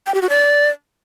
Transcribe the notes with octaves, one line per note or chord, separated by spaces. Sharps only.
G5
G4
F#4
D5